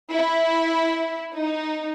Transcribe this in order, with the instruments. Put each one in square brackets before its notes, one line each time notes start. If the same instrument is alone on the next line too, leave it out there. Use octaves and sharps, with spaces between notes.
[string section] E4
D#4